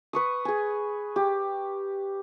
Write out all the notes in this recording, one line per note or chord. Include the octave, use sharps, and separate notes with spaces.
B4 C#6 D#6
G#4 G#5
G4